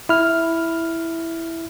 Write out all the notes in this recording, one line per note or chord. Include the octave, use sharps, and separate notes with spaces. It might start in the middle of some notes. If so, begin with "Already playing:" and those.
E4 F6